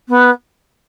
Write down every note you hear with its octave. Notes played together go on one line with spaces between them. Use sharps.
B3